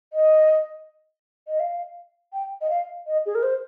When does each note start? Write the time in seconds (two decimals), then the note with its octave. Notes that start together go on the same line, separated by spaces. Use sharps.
0.13 D#5
1.48 D#5
1.60 F5
2.33 G5
2.61 D#5
2.70 F5
3.07 D#5
3.26 G#4
3.35 A#4
3.43 C5